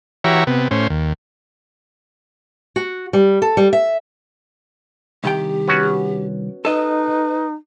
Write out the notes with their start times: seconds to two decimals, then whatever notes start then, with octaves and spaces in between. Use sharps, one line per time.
0.24 E3 F#4 G4 C#5 E5 A#5
0.47 C3 B3
0.71 A2 C#4 C5
0.90 D#2
2.76 F#4
3.13 G3
3.42 A4
3.57 G3
3.73 E5
5.24 C2 D#3 G4 G5
5.68 B3 C#4 F#4
6.65 D#4 A4 B4 D#5